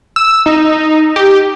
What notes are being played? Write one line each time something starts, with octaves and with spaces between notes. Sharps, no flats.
E6
D#4
G4